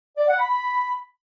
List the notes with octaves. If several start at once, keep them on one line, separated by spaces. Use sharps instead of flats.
D5
F#5
B5